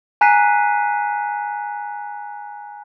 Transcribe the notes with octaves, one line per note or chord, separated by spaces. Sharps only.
G#5 A#5 F#6 B6 C7 D#7